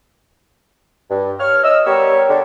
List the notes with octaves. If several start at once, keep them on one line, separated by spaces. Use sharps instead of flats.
G2
C#5 F6
D#5 E6
G3 B3 G4 A#4 C#5
D3